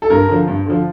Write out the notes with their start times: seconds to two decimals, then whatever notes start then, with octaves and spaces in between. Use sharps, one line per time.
0.02 A4
0.10 G2 A#4
0.28 D3 F3
0.47 G2
0.66 D3 F3